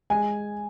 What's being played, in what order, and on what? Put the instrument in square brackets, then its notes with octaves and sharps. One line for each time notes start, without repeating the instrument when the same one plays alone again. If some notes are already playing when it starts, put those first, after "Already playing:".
[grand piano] G#3 G#5